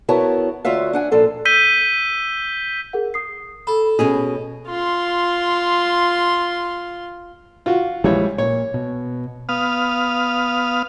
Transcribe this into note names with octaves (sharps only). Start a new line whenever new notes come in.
B3 E4 F#4 A#4 C#5 A5
D2 F4 F#4 C#5 E5 F5
D4 F#5 G#5
A#2 F3 A4 C5
E6 G6 B6 D#7 G7
G#4 A#4 F#5
D#6 C7
A4 B5
B2 C#4 G#4
F4 C6
F4 F#4
A#1 E3 F3 G3 G#3 C#5
A#2 C#5
B2
B3 F5 D#6 F6